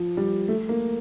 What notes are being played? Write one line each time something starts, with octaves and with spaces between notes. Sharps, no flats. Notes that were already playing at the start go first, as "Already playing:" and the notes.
Already playing: F3
G3
A3
A#3